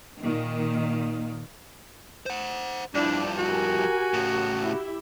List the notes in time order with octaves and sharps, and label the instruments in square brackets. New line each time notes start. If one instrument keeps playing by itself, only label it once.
[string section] A#2 D#3
[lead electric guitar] C5 F#5
[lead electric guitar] G2 F3 [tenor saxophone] D4 [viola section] E4 D5
[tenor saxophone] F#4 [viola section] G4 A#4 G#5
[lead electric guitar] A2 C#3
[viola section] E4 G4 E5